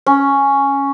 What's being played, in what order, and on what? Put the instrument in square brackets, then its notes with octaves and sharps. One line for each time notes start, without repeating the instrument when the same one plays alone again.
[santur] C#4